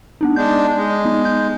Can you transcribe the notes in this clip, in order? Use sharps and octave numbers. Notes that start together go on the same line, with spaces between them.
B3 D4 D#4
G#3 D4 G6
G#3
B3 D#4
G6